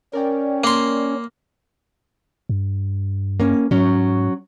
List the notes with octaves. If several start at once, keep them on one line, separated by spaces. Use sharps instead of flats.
C#4 A#4 D5 G5
A#3 C6
G2
A#3 C#4
G#2 F#3 C#4